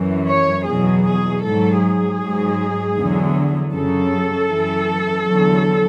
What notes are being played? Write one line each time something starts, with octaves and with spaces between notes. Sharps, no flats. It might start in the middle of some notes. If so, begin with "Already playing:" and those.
Already playing: F#2 E3
C#5
E2 B2 F#3 G#4
G#4
G#2 F#3 A4
G#4
G#2 F#3
E2 D3 F#3
F#2 C#3 F#3 A4
F#2 E3
E2 D3 F#3